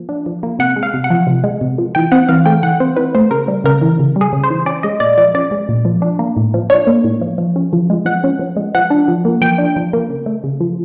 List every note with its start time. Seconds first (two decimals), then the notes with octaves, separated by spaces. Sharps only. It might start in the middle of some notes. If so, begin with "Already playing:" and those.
Already playing: F3 A#3
0.09 D4
0.26 F3
0.43 A#3
0.59 C3 F#5
0.76 G#3
0.83 F5
0.94 C3
1.04 F#5
1.10 F3
1.27 C3
1.44 G#3
1.61 C3
1.78 F3
1.95 E3 G5
2.12 C4 F#5
2.29 E3 F5
2.46 A3 G5
2.63 E3 F#5
2.80 C4 C5
2.96 E3 B4
3.15 A3 C5
3.31 C#3 A#4
3.48 G3
3.64 C#3 A#4
3.81 E3
3.99 C#3
4.16 G3
4.21 G#4
4.33 C#3
4.44 C5
4.50 E3
4.66 C#4 D5
4.83 G#3 D#5
5.00 A#2 D5
5.18 F3 D5
5.35 C#4 D5
5.51 G#3
5.69 A#2
5.85 F3
6.02 D4
6.19 A#3
6.37 A2
6.54 F3
6.70 D4 C#5
6.87 A#3
7.04 A2
7.21 F3
7.38 F3
7.56 C#4
7.73 F3
7.90 G#3
8.06 F3 F#5
8.24 C#4
8.39 F3
8.56 G#3
8.75 F3 F#5
8.90 D4
9.08 F3
9.25 A#3
9.42 F3 G5
9.58 D4
9.76 F3
9.93 A#3
10.10 C#3
10.26 A3
10.44 C#3
10.60 F3